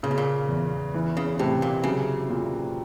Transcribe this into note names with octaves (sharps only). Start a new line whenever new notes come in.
A#2 C#3
B2
A#2
E2
E3
C#3
A2 C3
A#2
C#3 F#3
A#2